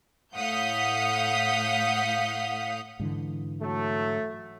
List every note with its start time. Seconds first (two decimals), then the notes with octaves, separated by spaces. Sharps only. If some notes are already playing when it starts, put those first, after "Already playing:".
0.35 A2 F5 F#5 D#6 G6 B6
3.00 G#2 D3 E3
3.62 F#3 A3